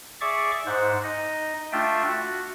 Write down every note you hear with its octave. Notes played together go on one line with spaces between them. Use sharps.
G#4 D5 E5 C#6 D6
G#2 C5 F#5
D#4 D#5
A3 D4 F4 E5 G5
F#4